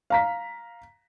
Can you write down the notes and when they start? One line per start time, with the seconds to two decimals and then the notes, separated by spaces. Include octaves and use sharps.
0.10 F5 A#5 B6